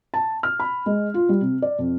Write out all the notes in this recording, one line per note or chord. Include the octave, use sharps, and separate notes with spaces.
A5
F6
B5
G#3
F4
G3
C3
D5
F2